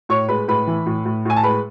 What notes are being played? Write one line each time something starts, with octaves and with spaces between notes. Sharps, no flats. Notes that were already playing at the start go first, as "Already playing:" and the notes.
A2 C#5 C#6
G#3 B4 B5
A2 B4 B5
E3
A2
A2
A2 G#5
A5
G#3 B4 B5